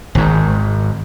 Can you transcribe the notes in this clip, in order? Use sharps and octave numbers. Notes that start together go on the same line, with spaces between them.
G#1 G#2